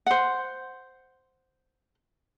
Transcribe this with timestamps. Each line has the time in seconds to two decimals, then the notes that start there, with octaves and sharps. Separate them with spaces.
0.06 C5 F#5